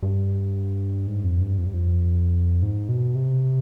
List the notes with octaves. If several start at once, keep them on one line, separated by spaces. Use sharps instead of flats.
G2
G#2
F2
G2
F2
G2
F2
G#2
B2
C3